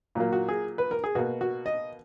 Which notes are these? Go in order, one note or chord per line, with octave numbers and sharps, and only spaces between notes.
A#2 F#3 A#3
F#4
G#4
B4
A#4
G#4
B2 A#3 F#4
F#4
D#5